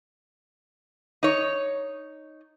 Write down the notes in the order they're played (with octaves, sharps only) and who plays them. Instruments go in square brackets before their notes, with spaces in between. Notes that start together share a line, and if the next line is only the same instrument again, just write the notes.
[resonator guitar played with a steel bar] D#4 C#5